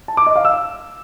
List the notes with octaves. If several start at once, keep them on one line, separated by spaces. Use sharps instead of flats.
A5
D6
D#5
F5
E6